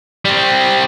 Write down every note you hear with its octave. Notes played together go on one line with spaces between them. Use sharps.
G3 C4